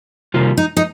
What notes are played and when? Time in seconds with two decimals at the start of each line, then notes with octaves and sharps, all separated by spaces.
0.34 C3 D#3 G3 A#3 F4
0.57 D#4
0.77 D#4